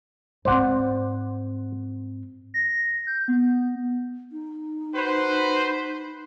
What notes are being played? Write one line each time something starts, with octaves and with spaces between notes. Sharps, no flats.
G#2 C4 C5 D5 F#5
A#6
G6
B3
D#4
F#4 B4 C5